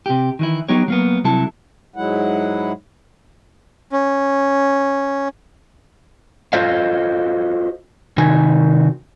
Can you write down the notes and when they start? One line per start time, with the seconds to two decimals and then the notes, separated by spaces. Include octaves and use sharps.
0.06 C3 G4
0.39 D#3 E3 E4
0.68 F#3 B3 D#4 G4 C#5
0.88 F#3 A#3 B3
1.24 C2 C3 F#3 E4 A4 A5
1.96 G#2 F#3 G#3 E4 F#5
3.91 C#4
6.53 F4 F#4 A4 C5 D#5 F5
8.18 C3 D#3 D#4 F#4 G#5